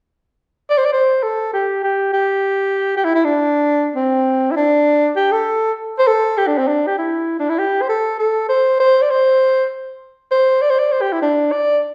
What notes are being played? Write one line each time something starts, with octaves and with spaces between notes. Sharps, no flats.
D5
C5
D5
C5
A4
G4
G4
G4
G4
E4
E4
D4
C4
E4
D4
G4
A4
C5
A4
G4
D4
C4
D4
G4
E4
D4
E4
G4
C5
A4
A4
C5
C5
D5
C5
C5
D5
C5
D5
C5
G4
E4
D4
D5